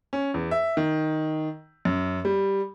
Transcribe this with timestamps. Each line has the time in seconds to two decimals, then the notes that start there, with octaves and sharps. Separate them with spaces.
0.13 C#4
0.34 E2
0.51 E5
0.77 D#3
1.85 F#2
2.25 G3